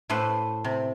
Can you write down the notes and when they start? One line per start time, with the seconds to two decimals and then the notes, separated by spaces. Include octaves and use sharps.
0.09 A2 A3 B4 C5 C6
0.64 C3